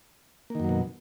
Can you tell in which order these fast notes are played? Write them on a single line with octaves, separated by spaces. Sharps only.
A#3 D#3 F#2 F#3 B2